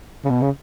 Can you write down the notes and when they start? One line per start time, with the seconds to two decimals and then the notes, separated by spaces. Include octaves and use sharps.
0.25 C#3
0.30 B2
0.42 C#3